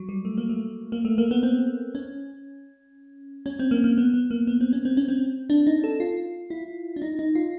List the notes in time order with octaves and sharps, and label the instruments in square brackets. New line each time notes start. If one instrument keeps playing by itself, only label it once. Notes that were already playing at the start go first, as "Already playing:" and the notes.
Already playing: [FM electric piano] F#3
G3
A3
A#3
A3
A#3
A3
A#3
B3
C4
C#4
C#4
C4
A#3
A#3
B3
B3
A#3
B3
C4
C#4
C4
C#4
C4
D4
D#4
A4
F4
E4
D4
D#4
D#4
F4